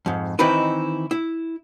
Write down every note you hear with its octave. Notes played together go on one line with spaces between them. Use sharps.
F2 G#2
D#3 E3 C4 D#4 E4 B4
E4